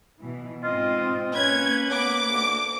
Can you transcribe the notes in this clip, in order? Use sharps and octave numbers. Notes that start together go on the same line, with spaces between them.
B2 E3
G#2 C4 F4 D#5
A#3 C#4 B4 G#6
B3 D6
D2